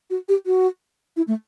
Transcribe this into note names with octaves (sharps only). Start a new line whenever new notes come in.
F#4
G4
F#4
E4
A3